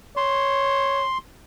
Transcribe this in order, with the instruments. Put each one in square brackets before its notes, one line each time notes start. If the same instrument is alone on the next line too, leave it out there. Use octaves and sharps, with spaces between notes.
[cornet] C#5 [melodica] C6